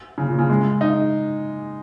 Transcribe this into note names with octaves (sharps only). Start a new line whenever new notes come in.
C#3
A#2
C#3
G#3
D#4